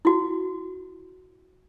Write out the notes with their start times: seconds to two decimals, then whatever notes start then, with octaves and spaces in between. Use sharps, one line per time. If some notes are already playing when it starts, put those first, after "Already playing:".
0.05 E4 F#4